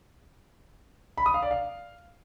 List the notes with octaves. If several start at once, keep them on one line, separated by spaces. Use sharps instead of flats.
B5
D#6
F5
D5
F5